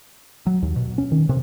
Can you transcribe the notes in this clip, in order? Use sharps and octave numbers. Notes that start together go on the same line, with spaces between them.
F#3
D#2
B2
C#4
D#3
C3